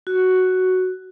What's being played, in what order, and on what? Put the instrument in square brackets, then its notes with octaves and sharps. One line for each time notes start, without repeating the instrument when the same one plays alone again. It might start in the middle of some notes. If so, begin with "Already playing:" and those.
[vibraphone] F#4